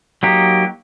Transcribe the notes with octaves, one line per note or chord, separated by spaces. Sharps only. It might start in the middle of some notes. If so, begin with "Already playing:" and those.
F#3 A#3 D#4 G4